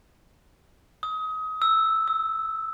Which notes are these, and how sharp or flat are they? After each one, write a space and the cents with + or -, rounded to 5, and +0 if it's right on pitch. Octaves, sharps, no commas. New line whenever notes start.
D#6 +30
E6 -5
E6 -30